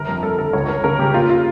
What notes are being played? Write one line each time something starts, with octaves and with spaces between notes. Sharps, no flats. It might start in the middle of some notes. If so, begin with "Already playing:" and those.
Already playing: G1 A#4
F2
F2 A4
G1 A4
C#2 C#5
C#2 A#4
C#3 A#4
C#3 G4
A#3 F4
F4